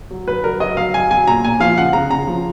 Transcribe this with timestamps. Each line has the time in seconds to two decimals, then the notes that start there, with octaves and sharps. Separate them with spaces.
0.11 F#3
0.28 F#3 B4
0.44 F#3 A#4
0.60 F#3 D#5
0.77 F#3 F5
0.94 F#3 G#5
1.11 F#3 G#5
1.27 A#2 A#5
1.44 A#2 G#5
1.60 F3 F5
1.77 C#3 F#5
1.93 C#3 A#5
2.10 C#3 A#5
2.27 F3